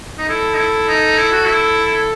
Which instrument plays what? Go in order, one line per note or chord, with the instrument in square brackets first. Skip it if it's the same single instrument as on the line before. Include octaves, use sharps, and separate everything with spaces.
[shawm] D#4
[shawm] E4 [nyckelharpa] A4
[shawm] D#4
E4
D#4
E4
F#4
E4